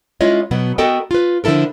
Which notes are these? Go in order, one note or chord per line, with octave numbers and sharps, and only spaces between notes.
G#3 C#4 E4 F4 C#5 D#5
B2 F#3 B3
B3 F#4 A4 A#4 D#5 G5
F4 B4
D3 F3 E4 A4 A#4